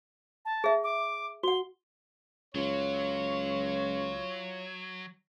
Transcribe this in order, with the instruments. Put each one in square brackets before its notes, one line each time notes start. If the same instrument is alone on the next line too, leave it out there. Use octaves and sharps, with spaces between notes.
[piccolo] A5
[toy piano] G#4 E5
[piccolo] D6
[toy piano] F#4 F#5 [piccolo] G7
[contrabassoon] C#2 [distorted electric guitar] F#3 [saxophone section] F4 C#5